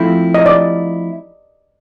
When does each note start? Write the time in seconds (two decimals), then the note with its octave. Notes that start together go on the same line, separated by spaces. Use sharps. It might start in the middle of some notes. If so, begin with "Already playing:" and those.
Already playing: F3 A3 C4 E4
0.34 D#5
0.46 D5